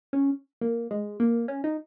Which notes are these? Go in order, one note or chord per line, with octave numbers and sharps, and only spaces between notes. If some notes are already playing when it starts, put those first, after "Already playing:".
C#4
A#3
G#3
A#3
C#4
D#4